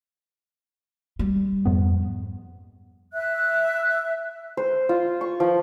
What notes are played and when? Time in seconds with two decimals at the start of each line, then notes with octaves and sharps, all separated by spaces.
1.19 G3
1.66 F2 G#2 B3
3.14 E5 F#6
4.57 C5
4.89 F4
5.21 C#6
5.40 F3